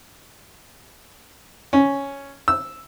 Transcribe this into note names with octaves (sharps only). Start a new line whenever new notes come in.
C#4
E6